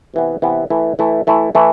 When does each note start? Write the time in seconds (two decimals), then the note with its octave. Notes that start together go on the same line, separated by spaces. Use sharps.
0.14 C3 E3 B3
0.42 C3 E3 B3
0.70 E3 A3 E4
0.99 E3 A3 E4
1.27 E3 A3 E4
1.55 E3 A3 E4